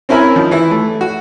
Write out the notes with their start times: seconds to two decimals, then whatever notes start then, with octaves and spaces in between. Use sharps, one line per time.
0.09 C4 C#4 E4 A#4 G#5 B5
0.36 D#3 F3
0.51 E3 E4
0.71 A3
1.01 F#4